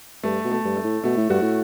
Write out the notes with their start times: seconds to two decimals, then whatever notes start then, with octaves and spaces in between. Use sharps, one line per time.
0.23 G2 A3
0.44 B2
0.51 A3
0.65 G2
0.77 A3
0.84 A2
1.04 B2 A3
1.17 A2
1.29 G2 F#4
1.42 A2